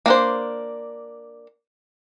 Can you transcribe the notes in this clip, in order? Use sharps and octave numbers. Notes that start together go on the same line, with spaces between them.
A#3 D4 C5